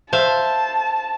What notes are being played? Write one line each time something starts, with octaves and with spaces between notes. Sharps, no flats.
C5 E5 F5 A5